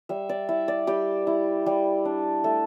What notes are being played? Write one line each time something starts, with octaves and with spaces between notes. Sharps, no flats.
G3 E5
D5
E4 E5
D5
G3 G4
E4
G3
D4
A3 A4